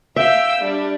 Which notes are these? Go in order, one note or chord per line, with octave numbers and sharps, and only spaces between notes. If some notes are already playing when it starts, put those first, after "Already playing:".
E5 F5 G5 E6
G3 D4